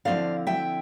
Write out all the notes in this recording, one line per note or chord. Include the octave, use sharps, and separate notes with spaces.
D3 F3 C4 E4 D5 F5
E5 G5